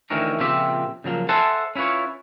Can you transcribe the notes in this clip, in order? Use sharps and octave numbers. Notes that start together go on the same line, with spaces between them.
D2 D#3 E3 C#4 A#4
A#2 C#3 F3 C4 G4 E5
C#3 F3 F#3 A#3
A4 C5 E5 F#5 G#5 A5
C#4 E4 F4 B4 C#5